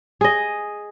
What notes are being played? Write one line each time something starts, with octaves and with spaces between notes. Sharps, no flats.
G#4 D#5